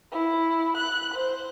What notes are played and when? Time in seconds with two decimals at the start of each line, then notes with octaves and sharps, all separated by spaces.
0.11 E4
0.77 F#6
1.14 C5